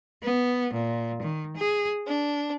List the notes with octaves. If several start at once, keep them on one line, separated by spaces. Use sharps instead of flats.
B3
A#2
D#3
G#4
D4